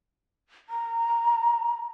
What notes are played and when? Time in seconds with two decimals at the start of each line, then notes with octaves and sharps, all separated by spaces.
0.69 A#5